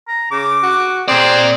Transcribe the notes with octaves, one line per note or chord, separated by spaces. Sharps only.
A#5
C#3 D6
F#4
A#2 C4 G#4 D5